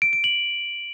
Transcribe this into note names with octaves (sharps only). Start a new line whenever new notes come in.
D7
D7
F#7